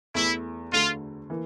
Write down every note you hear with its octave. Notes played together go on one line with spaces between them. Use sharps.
E2 E3 A3 E4
D2 D3 A3 F4
E3 A#3